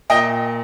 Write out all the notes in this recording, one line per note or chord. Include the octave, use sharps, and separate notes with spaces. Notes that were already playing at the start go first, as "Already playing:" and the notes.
A#2 D#5 G5